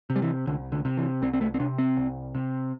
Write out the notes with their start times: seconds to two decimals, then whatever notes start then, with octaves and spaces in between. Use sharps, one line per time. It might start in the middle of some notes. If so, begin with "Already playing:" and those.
0.10 C3
0.16 G3
0.22 E3
0.47 C2 D3
0.72 D3
0.85 C3
0.97 E3
1.22 C2 C4
1.33 C4
1.41 A3
1.54 C4
1.60 C3 D4
1.78 C4
1.97 C2
2.35 C3